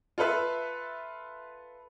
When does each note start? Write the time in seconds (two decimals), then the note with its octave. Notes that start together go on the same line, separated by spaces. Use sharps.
0.18 F4 A4 B4 E5